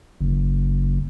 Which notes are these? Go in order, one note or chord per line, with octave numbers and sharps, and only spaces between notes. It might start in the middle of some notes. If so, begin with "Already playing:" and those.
F#1